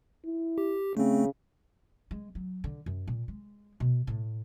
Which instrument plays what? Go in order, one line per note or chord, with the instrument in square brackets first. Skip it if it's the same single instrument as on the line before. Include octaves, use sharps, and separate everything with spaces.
[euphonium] E4
[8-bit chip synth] G4
[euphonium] C#3 [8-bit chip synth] A3 C4
[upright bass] G#3
F#3
D3
F#2
A#2
G#3
B2
A2